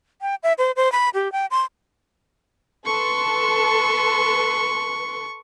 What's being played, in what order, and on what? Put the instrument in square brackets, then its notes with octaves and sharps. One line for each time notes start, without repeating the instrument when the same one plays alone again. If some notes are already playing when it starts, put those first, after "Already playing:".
[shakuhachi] G5
E5
C5
C5
B5
G4
G5
C6
[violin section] A4 B4 C6 [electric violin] C#6